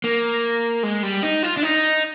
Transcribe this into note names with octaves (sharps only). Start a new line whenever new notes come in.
A#3
G#3
G3
D#4
F4
D4
D#4